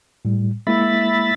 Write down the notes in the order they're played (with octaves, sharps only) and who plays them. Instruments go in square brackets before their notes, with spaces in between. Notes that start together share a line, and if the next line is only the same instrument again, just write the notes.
[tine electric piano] A2 G3
[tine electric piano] G#3 A#3 E4 [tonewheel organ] E5 B5 A6